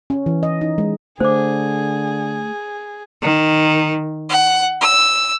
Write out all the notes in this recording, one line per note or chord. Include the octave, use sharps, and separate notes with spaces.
C#4
E3
D#5
D#4
G#3
D3 A3 G#4 C5 D6
D#3
F#5
E6